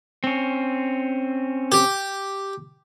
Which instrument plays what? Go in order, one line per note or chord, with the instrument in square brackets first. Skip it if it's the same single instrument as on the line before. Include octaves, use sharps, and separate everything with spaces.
[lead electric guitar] C4 C#4
[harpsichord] G4